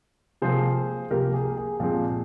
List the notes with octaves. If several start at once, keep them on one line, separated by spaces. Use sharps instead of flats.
C3 F3 A#3 G#4 C5
C3 F3 A#3 G4 A#4
G#4
G#4
A#2 F3 G#3 C4 G#4